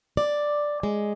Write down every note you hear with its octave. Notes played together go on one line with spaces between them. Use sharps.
D5
G#3